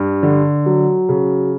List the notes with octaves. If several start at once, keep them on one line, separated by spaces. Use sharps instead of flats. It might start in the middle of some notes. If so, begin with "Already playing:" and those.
Already playing: G2
D3
F#3
C#3